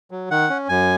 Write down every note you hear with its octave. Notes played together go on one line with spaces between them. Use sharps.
F#3
D#3 F#5
C#4
F#2 G#5